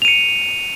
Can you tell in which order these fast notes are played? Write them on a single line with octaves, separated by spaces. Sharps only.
F7 D#7 C#7